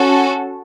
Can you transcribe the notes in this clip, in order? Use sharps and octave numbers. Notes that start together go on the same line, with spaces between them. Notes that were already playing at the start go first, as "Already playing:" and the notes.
Already playing: C#4 F#4 A4